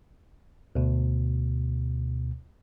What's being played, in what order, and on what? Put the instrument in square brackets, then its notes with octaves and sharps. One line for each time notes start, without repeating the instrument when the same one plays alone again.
[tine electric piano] D2 B2